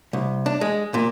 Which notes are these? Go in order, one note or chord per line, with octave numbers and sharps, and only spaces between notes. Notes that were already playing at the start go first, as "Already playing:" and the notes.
C2
D4
G#3
A#2